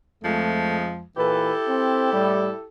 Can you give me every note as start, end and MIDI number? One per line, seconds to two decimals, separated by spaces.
0.23 1.04 41
0.23 1.04 53
0.23 1.04 56
0.23 0.82 57
1.17 1.52 46
1.17 1.52 52
1.17 2.67 64
1.17 2.67 67
1.17 2.67 69
1.17 1.52 71
1.68 2.13 60
2.13 2.50 45
2.13 2.50 55